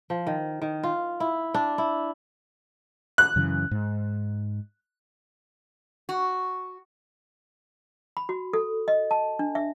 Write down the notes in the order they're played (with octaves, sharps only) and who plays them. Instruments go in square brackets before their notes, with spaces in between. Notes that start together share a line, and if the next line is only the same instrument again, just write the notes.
[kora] F3
D#3
D#3
F4
E4
D4
E4
[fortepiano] F#6
[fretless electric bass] F#2 C#3 E3
G#2
[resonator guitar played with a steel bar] F#4
[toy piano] B5
F#4
A4
D#5
A5
D4
E5